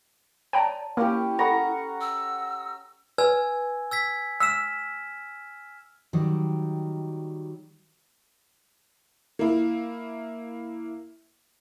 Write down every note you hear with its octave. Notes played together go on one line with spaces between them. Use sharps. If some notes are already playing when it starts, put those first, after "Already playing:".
C#5 D5 G5 A5 A#5
A#3 C#4 E4 G4
A4 F#5 A#5 B5 C#6
E6
B4 G#5 E6 G#6
E6 G#6 B6
E6 F6 B6 E7
D#3 F#3 G3
A#3 E4